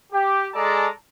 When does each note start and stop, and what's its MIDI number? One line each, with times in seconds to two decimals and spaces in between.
0.13 0.47 67
0.54 0.87 56
0.54 0.87 68
0.54 0.87 69
0.54 0.87 74
0.54 0.87 81
0.54 0.87 82